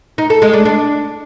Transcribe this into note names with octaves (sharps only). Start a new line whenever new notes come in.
D#4
A4
G#3
D4
D4